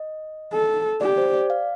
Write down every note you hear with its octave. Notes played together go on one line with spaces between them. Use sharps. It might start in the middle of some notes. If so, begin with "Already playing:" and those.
Already playing: D#5
A4
G4 D5
C5
D5
F5